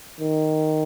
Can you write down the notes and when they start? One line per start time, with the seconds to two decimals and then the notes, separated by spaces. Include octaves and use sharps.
0.21 D#3